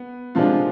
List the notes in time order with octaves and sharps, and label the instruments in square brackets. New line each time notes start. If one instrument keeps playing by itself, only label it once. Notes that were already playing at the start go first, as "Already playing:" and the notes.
Already playing: [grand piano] B3
[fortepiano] C3 F3 G#3 D4 [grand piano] F4